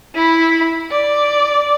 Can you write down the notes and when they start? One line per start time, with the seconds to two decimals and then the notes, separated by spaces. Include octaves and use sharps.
0.15 E4 B5
0.91 D5